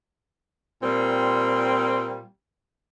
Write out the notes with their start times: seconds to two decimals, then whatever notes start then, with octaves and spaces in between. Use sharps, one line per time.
0.82 A#2 G3 C4